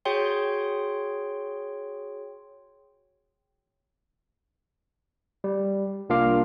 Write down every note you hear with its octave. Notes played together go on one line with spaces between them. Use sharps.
F#4 G#4 C#5 G5 C6
G3
C2 A#3 D4 F4 F5 D6